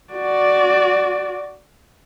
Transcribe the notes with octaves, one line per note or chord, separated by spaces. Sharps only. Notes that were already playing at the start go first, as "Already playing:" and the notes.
F#4 D5